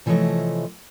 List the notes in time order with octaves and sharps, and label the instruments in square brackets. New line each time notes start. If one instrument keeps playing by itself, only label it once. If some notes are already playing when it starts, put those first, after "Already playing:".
[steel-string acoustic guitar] C3 E3 F3 A3 C#5 D#5